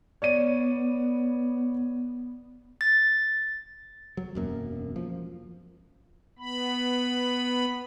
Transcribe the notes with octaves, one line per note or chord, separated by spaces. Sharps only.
B3 C#5 D5 D#7
A6
F#3
E1 F#2 A#3
F3
B3 B5